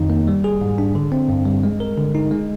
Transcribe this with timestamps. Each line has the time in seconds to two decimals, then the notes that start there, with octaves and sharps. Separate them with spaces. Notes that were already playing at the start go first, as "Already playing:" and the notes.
Already playing: F2 D#3 D#4
0.10 A#3
0.27 G3
0.44 G#4
0.61 G#2
0.78 D4
0.95 D3
1.12 C4
1.29 G2
1.46 G3
1.63 G#3
1.80 A#4
1.98 D3
2.15 D#4
2.31 G#3